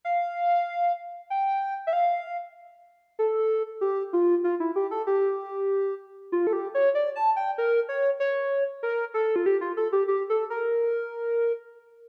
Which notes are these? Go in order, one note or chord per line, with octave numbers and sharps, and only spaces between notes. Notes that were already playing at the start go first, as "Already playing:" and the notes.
F5
G5
E5
F5
A4
G4
F4
F4
E4
G4
A4
G4
F4
A4
G4
C#5
D5
A5
G5
A#4
C#5
C#5
A#4
A4
F4
G4
F4
A4
G4
G4
A4
A#4